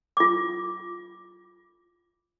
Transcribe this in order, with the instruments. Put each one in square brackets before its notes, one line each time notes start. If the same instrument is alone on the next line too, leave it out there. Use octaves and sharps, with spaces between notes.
[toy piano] F4 D6